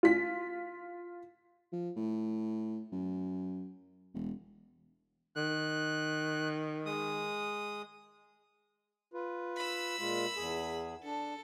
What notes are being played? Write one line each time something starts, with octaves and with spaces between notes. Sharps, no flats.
F4 B6
F3
A2
F#2
E1
D#3 F#6
G#3 D#6
F4 B4
B5 E6
A#2 G#3 F4
E2 G#4
D4 A4